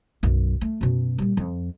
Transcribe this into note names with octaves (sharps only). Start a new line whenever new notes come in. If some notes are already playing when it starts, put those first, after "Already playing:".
B1 F#2
A3
F#2 B2
A#2 G3
F2